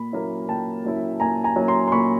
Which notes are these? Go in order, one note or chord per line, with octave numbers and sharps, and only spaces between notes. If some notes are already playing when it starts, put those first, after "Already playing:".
Already playing: A#2 B5
F#3 A#3 C#4 E4
A#2 G5 A5
F#3 A#3 C#4 E4
A#2 G#5 A#5
G#5 A#5
F#3 A#3 C#4 E4
A#5 C6
C6
A#2 B5 C#6